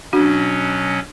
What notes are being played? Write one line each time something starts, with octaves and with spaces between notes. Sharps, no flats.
B2 F#3 C#4 D4 F#4